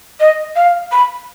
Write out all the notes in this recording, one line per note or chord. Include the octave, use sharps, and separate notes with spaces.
D#5
F5
B5